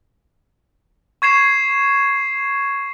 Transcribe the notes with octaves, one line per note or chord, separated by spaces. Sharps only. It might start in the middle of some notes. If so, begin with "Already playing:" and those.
C#6 G#6 C7 E7